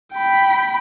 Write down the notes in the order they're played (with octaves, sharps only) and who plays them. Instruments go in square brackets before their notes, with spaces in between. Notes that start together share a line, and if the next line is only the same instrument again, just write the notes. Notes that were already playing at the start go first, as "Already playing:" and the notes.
[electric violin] G5 B5